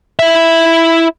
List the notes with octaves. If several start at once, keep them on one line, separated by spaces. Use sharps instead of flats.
E4 E5